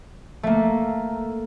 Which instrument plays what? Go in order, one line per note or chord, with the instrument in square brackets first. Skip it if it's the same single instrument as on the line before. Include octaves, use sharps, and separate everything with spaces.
[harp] A3 A#3